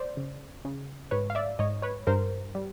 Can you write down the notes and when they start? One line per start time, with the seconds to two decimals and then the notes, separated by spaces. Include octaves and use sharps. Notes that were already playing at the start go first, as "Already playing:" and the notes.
Already playing: C5 D5
0.17 C#3
0.65 C#3
1.11 G#2 B4 C#5
1.30 F5
1.35 D5 E5
1.59 G#2 C#5 D#5
1.82 B4 C#5
2.07 G2 A#4 C5
2.55 G3